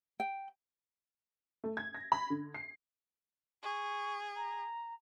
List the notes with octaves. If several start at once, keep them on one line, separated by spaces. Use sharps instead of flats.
G5
A3
G#6
A#6
B5
D3
C7
G#4 C#6
A#5